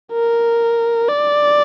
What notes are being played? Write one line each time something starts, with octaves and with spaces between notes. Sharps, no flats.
A#4
D5